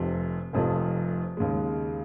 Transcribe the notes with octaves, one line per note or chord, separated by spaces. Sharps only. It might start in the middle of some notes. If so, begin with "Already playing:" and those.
Already playing: F1 F2 C3 F3
F1 F2 C3 F3
D#2 C#3 G#3